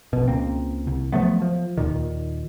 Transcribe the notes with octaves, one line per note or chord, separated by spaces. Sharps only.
A#1 B2
C#2 A#3 C4
C2
F3 F#3 A3 B3
F3
D#2 A#2 D#3